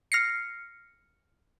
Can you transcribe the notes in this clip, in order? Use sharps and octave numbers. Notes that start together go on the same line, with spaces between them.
F6 A#6 C7 C#7